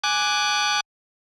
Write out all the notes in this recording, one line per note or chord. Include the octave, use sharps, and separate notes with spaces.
G#5 D6 F#6